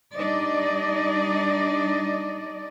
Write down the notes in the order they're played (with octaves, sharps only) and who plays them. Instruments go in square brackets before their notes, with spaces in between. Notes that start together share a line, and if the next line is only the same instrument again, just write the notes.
[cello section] G3 D4 D#4 D5 D#5